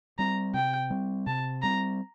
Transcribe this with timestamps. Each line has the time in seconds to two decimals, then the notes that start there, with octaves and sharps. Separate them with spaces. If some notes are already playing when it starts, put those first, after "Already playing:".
0.18 G3 C4 A#5
0.54 C3 G5
0.90 G3 C4
1.27 C3 A5
1.62 G3 C4 A#5